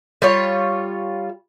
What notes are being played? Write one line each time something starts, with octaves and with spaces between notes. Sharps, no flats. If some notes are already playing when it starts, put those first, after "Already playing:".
G3 F4 C#5